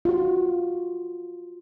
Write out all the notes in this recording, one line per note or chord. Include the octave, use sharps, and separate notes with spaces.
F4 F#4